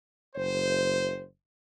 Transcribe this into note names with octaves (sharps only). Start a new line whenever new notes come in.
F#1 C5